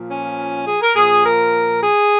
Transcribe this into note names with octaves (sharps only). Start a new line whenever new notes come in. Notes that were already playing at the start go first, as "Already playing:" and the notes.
Already playing: A#2 F3
C#4
G#4
A#4
A#2 F3 G#4
A#4
G#4